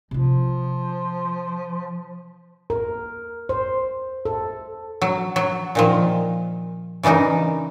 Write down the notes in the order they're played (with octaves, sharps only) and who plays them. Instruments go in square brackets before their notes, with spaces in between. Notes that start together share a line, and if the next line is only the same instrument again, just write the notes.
[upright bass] C3 F4 [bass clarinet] F3
[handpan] A#4
C5
A4
[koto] F#3
F#3
A#2 D#3 F3
C#3 E3 D4 D#4 A#4